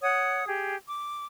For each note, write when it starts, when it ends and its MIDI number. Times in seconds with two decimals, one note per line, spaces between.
0.02 0.45 73
0.02 0.45 78
0.02 0.45 87
0.47 0.75 67
0.47 0.75 68
0.89 1.25 86